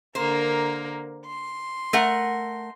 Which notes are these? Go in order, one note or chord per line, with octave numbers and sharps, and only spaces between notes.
D3 A#3 A#4 C5
C6
A3 A#4 F#5